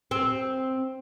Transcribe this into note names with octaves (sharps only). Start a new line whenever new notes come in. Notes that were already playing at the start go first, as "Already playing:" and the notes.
C4